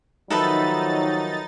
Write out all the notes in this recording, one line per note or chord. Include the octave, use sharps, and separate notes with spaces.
D#3 F3 F#3 D#4 A4 B4 E5 A6